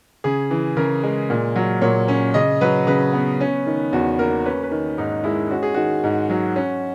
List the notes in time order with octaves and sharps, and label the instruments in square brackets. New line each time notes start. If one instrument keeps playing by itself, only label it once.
[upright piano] C#3 G#4
E3
C#3 A#4
G#3
A#2
F#3
A#2 C#5
C#4
C#3 D#5
F#3 B4
C#3 B4
B3
C#4
D#3
E2 F#4
A#3 A#4
C#4 B4
B4
D#3
G#2 D#4
G#3 E4
C#4 F#4
G#4
D#3 F#4
G#2
F#3
C#4